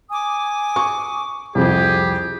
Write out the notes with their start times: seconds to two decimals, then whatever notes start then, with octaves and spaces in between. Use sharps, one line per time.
0.11 G#5 D6 D#6
0.76 C#6
1.55 C2 F2 G4 G#4